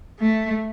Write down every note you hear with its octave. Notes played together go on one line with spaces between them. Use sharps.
A3